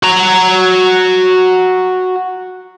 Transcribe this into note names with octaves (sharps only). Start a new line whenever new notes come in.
F#4 A#5